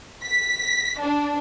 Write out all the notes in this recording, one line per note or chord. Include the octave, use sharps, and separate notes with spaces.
B6
D4